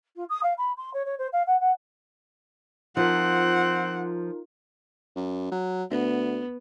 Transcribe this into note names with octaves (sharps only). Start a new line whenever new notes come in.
F4
D#6
F5
B5
C6
C#5
C#5
C5
F5
F#5
F#5
F3 C4 D#4 F4 A#4 F#5
F#2
F#3
D2 B3